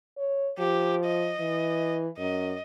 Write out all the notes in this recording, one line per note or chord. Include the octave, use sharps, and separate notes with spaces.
C#5
F3 G4
D#5
E3
F#2 D#5